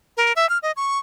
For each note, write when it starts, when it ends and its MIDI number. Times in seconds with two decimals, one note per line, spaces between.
0.17 0.33 70
0.36 0.49 76
0.49 0.58 89
0.63 0.72 75
0.76 0.98 85